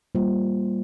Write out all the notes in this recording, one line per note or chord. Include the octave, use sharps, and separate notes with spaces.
G3 A#3 F4 C5